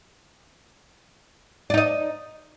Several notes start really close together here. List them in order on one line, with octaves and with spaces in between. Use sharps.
D5 D#4 D#5